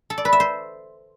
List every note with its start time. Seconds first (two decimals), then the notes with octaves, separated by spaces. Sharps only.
0.10 A4
0.18 D5
0.25 B4
0.33 E5
0.40 C5